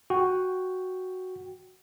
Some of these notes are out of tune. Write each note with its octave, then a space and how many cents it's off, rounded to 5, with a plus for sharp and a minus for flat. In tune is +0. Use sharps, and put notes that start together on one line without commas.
F#4 +0 G5 +0